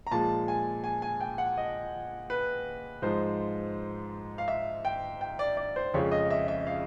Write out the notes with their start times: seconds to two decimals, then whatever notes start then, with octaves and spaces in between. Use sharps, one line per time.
0.07 A#5
0.11 A#2 F3 G#3 A5
0.48 G#5
0.84 G#5
1.02 G#5
1.21 G5
1.38 F#5
1.57 D#5
2.30 B4
3.02 G#2 F3 G#3 C5
4.38 F5
4.48 E5
4.85 G5
5.21 G5
5.39 D5
5.57 D5
5.76 C5
5.94 F2 C#3 F3 G#3 C#5
6.12 D#5
6.30 E5
6.48 E5
6.67 F5